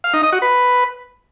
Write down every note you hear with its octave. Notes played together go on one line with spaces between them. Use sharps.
F5
D#4
D#5
F#4
B4